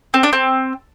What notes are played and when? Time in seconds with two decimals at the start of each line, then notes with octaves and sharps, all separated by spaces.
0.14 C4
0.23 D4
0.33 C4